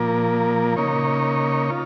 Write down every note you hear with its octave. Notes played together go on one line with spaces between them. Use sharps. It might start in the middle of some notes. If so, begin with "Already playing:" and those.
Already playing: A#2 F3 A#3
C#3 A#3 D#4 C#5
F4